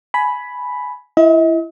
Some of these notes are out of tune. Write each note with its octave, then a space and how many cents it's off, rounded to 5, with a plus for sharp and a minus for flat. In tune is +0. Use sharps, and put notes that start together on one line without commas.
G#5 +20 B5 +0
E4 +20 D#5 +45